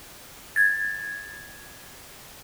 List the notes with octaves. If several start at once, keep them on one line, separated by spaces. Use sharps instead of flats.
G#6 A6